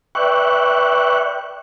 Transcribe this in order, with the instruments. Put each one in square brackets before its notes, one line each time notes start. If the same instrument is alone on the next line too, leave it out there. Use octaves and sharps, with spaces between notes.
[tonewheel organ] B4 D5 E5 G5 C#6 F#6